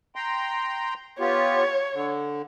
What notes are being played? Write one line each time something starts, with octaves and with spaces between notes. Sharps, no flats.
G5 A#5 C6
B3 F4 G4 C#5
D3